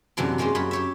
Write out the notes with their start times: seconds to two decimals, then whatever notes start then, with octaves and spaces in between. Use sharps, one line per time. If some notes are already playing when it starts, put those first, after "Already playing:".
0.17 F#2 C3 E3 F#3 A#3 D4
0.38 G#3 A#3 C#4 G4 C5
0.55 F#2 C#5 B5
0.71 G4 C#5 E5